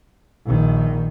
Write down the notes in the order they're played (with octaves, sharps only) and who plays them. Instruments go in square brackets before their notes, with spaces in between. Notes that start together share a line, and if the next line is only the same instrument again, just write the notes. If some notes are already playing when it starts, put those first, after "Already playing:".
[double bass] A#1 D#3